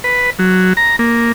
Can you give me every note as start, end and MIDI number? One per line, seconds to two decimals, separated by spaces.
0.04 0.30 71
0.39 0.73 54
0.77 0.96 82
0.99 1.32 58